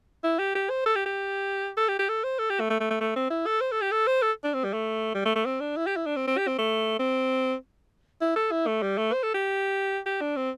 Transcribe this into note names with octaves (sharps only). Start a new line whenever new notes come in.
E4
G4
G4
C5
A4
G4
G4
A4
G4
G4
A4
C5
A4
G4
A3
A3
A3
A3
A3
C4
E4
A4
C5
A4
G4
A4
C5
A4
D4
C4
G3
A3
G3
A3
A3
C4
D4
E4
G4
E4
D4
C4
C4
G4
C4
A3
C4
E4
A4
E4
A3
G3
A3
C5
A4
G4
G4
D4
C4